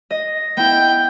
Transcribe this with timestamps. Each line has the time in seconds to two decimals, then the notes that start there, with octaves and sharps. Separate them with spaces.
0.11 D#5
0.57 B3 E4 G5